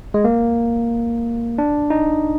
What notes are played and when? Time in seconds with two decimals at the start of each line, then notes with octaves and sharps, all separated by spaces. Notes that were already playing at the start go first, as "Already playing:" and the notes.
0.14 G#3
0.24 A#3
1.58 D4
1.90 D#4